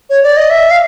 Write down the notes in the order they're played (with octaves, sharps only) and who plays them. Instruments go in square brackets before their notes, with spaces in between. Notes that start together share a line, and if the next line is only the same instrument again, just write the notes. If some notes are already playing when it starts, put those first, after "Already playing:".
[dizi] C#5
D5
D#5
E5
F5